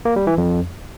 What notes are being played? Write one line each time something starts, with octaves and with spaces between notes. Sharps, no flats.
A#3
G3
E3
F2